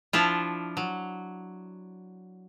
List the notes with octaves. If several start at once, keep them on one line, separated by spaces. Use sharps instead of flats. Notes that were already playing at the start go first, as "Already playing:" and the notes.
F3 D4 E4 F4
F#3